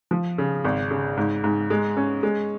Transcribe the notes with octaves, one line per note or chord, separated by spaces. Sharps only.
F3
C#3
G#1
C#3
G#2
G#2
G#3
C#4
G#3